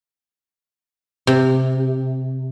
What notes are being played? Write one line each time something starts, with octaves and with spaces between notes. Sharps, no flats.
C3